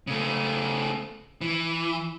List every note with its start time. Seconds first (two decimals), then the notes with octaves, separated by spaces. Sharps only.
0.07 C#3 A3
1.41 E3